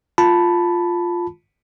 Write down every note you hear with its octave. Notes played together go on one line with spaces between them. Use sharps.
F4 A5 B5